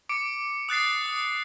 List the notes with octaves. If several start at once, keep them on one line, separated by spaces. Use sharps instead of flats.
D6 C#7 D7
D#6 F#6 A6 C7
D#6